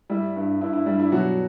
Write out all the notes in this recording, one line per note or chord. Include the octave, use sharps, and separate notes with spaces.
G3 E4
G2
G2 E4
E4
G3 D4
E4
B2 F#3 F#4